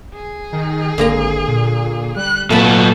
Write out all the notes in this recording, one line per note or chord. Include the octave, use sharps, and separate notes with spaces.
G#4
D#3
G#1 D3 A#3 A#5
A#2
G3 F#6
A#2 F#3 A3 B3 A4 B5